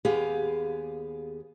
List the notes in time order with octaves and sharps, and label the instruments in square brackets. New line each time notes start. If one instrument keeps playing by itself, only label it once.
[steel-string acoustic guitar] D#2 B3 G4 G#4 F5